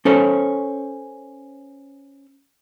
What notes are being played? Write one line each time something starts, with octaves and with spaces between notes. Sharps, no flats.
C#4 A4 C5 C#5